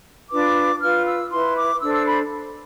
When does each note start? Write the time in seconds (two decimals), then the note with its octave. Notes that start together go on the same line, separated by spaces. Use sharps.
0.30 D4 F4 B4 D6
0.81 F4 B4 F6
1.06 E6
1.30 E4 B4 C6
1.56 D6
1.81 D4 A4 C5 E6
1.93 E6
2.06 B5